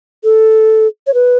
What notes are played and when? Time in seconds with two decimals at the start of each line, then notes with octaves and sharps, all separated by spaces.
0.24 A4
1.07 C#5
1.14 B4